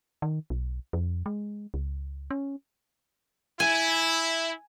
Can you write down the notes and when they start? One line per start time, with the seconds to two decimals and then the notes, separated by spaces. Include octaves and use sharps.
0.22 D#3
0.50 B1
0.93 F2
1.26 G#3
1.74 C#2
2.31 C#4
3.60 E4 G#5